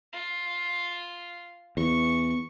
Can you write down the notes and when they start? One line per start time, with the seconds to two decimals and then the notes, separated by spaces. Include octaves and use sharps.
0.13 F4
1.77 E2 C#6